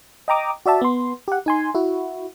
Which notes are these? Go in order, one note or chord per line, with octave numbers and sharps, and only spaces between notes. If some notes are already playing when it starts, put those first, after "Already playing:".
D#5 G5 A#5 D6 D#6
F#4 D5 E5 A5
B3 C6
G4 F#5
D#4 G#5 C6
E4 F#4